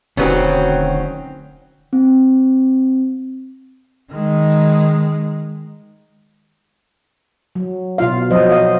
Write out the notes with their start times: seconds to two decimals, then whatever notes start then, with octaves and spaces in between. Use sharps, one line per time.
0.17 E1 D2 D#3 F#3 C4 C#4 B4
1.93 C4
4.11 D#3 G#3
7.56 F#3
7.98 B2 F4 F5
8.30 F3 F#3 C5 D#5
8.49 D#5 F5